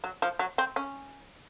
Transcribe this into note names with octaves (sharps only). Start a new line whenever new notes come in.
F#3
F3
F#3
C4
C#4